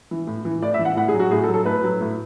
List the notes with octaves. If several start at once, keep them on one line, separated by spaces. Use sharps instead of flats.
E3
A2
E3
A2 D5
E5
E3
F#5
A2 F#5
G#4
F#3
F#4
A2 G#4
A4
F#3
A4
A2 B4
F#3
A2